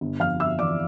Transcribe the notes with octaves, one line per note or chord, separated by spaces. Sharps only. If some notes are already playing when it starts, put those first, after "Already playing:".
G1
F2 F5 F6
G1 E5 E6
E3 D5 D6